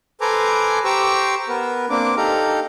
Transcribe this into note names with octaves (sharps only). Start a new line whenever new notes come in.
A4 B4 C5 G#5 A#5 D6
G4 C5 A#5 C#6 D6 E6
B3 A#4 B4
A#3 C4 D4 D6
D#4 G4 A4 F5 A#5